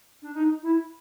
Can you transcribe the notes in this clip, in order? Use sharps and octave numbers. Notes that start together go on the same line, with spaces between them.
D4
D#4
E4